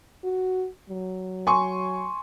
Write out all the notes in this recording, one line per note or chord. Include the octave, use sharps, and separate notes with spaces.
F#4
F#3
G#5 C6 C#6